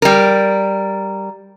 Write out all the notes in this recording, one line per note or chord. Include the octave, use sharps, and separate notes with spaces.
G3 A#4